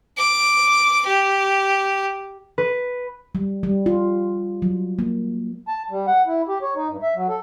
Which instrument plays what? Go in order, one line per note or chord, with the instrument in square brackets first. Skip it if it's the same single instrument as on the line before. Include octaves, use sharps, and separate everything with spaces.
[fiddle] D6
G4
[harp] B4
[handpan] G3
G3
F4
F#3
A#3
[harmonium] A5
G3
F#5
E4
G4
C#5
D#4
G2
E5
F#3
A4